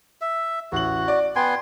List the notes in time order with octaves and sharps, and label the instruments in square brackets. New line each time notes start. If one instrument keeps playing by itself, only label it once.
[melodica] E5
[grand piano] A1 F#7 [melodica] F#4
[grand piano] D5
[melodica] B3 G#5 C6 [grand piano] G5